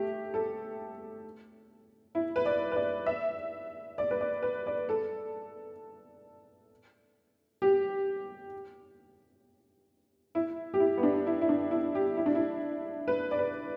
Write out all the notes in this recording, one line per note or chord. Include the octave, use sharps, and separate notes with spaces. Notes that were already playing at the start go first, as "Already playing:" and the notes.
Already playing: A3 G4
A4
E4
B4
D5
B4
D5
E5
D5
B4
D5
B4
D5
A4
G4
E4
G4
E4
B3
D4
E4
E4
D4
E4
G4
E4
D4
E4
B4
D5
B4